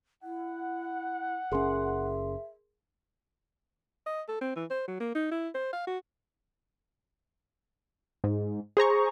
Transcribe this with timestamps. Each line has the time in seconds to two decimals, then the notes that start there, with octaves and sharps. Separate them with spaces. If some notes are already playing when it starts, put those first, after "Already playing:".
0.23 E4 F#5
1.52 F#1 C#4 G#4 A#4 E5 C6
4.06 D#5
4.28 A4
4.41 C4
4.56 E3
4.70 C5
4.88 F#3
5.00 A#3
5.15 D#4
5.31 E4
5.55 C5
5.73 F5
5.87 F#4
8.24 G#2
8.77 G#4 C5 A#5 C#6